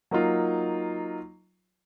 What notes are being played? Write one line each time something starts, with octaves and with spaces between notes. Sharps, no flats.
F#3 A#3 D#4 F4